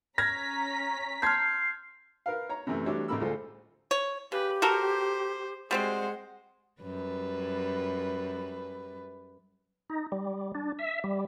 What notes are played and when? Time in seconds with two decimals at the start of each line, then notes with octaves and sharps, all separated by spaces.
0.18 C#4 A#5 F6 G#6 A#6 B6
1.22 A5 C6 F6 G6 G#6 C7
2.26 A#4 B4 F5
2.49 C#5 A#5
2.67 F#2 C3 E3 A3
2.86 E3 G3 A3 D4 F#4 C#5
3.08 A1 C#3 A#3 B5 E6
3.20 D2 G#3 F4 A4 C5
3.91 C#5
4.32 C#3 G4 B4
4.62 F#4 A4 A#4 C5
5.71 G3 G#3 C4 F#4 C5 F#5
6.82 F#2 G3 B4
9.90 D#4
10.12 G3
10.55 D4
10.79 E5
11.04 G3